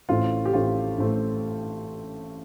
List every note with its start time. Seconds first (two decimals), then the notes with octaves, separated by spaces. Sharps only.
0.09 A1 A2 A3 C4 F4
0.46 G4
0.53 A1 A2 A3 C4 F4
0.98 A1 A2 A3 C4